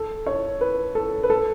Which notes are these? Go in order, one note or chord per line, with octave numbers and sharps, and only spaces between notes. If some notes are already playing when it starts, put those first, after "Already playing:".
Already playing: A4
C#5
B4
A4
B4
A4